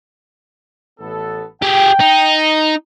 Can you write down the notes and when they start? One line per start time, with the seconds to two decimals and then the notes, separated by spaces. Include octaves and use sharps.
1.00 A1 B3 A4
1.62 G4 G#4 G5
2.00 D#4